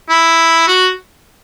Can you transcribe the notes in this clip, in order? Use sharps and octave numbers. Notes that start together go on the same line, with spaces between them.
E4
F#4